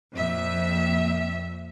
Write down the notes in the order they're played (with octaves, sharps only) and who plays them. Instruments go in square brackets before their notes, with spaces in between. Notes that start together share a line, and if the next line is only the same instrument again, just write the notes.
[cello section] F2 A#2 E5